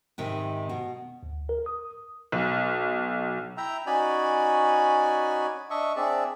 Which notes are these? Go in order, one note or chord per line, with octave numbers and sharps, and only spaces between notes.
G#2 C3 D#3
B2
D2
A#4
D#6
B1
E4 E5 G5 A#5
C#4 D#4 F#4 D5 G#5 B5
D4 D#5 E5 C#6
C4 D4 G#4 D5 E5